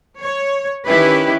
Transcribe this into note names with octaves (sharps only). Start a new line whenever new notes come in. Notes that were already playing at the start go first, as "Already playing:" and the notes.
C#5
D#3 C#4 E4 G4 B4